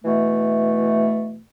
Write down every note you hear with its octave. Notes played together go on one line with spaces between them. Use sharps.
B2 E3 A3